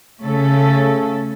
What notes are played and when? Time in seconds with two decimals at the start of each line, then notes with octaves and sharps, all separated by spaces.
0.22 C#3 A3 C#4 A4